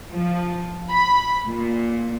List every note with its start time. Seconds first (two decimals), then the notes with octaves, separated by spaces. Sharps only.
0.10 F3
0.90 B5
1.46 A#2